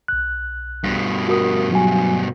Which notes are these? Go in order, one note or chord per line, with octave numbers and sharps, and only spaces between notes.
B1 F#6
G2 B2
F#4 A#4 D#6
F#3 F#4 G#5